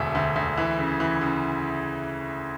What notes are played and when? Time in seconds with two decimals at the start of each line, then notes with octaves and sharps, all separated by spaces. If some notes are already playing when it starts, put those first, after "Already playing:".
Already playing: E1 D2 E5 G#5
0.15 D2
0.36 D2
0.57 E3 E5
0.78 C#3
1.00 E3
1.21 C#3